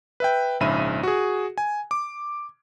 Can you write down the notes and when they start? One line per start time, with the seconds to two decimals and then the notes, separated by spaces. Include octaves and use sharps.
0.20 B4 E5 G5
0.60 A#1 G#2 C#3 E5 B5 D#7
1.03 F#4 G#4
1.58 G#5
1.91 D6